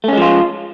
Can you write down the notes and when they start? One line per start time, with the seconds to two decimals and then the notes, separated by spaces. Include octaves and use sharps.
0.04 A3
0.08 C#4
0.13 G#3
0.17 F3
0.22 F4